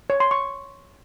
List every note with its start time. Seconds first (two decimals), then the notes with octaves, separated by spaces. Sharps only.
0.10 C#5
0.20 C6
0.31 C#6